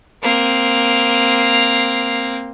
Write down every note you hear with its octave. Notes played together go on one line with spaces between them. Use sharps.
A#3 C4